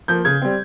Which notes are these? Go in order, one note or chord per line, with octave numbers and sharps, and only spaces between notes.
F3 A#3 G6
C#3 G#6
G3 C4